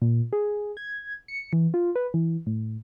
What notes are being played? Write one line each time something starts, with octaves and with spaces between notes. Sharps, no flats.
A#2
G#4
G#6
C#7
E3
F4
B4
E3
A2